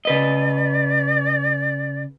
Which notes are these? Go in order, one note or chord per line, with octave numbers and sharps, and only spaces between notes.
C#3 B4 D5 D#5